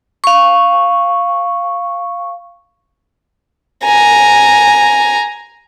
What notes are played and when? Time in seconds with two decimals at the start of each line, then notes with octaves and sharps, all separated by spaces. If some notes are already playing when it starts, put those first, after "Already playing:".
0.24 F5 C#6
3.84 G#5 A#5